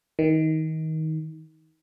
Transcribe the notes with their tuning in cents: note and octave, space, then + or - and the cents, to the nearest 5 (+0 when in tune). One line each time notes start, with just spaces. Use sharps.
D#3 +25